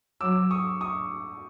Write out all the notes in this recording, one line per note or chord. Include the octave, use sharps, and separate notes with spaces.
F#3 D6 E6
C#6 D#6
C#6 D#6